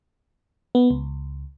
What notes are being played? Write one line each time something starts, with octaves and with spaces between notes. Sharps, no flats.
B3
C#2